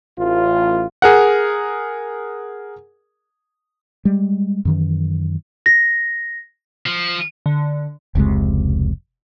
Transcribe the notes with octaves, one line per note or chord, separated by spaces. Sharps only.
A1 F4
G#4 A#4 F#5
G3 G#3
F#2 D#3 E3
A#6
F3
D3
F1 C#2 C3 G#3